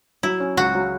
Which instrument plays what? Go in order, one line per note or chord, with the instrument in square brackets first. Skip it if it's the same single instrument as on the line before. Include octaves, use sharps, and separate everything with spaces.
[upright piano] F#3 [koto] E4
[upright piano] C#4
[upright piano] C#2 [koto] F#4
[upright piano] F#3